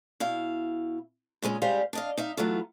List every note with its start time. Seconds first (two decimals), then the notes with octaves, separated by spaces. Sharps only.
0.20 B2 E4 F5
1.42 A#2 C#3 G#3 C#4
1.62 C#3 G3 G#3 G4 C5 F5
1.93 D4 D#5 F5
2.17 D#4 E5 F5
2.37 E3 F#3 A3 B3 F4